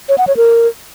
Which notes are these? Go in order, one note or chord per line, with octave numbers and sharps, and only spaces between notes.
C#5
F#5
C#5
A#4